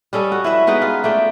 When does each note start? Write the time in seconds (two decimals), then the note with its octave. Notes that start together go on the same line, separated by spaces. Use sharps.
0.13 G3 C#4 A4 D#5
0.32 F#4
0.44 E4 B4 E5
0.67 G#3 B3 D#4 B4
0.82 F4
1.04 A3 D5 G5